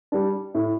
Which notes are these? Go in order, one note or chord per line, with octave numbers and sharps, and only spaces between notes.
G3 D4
A2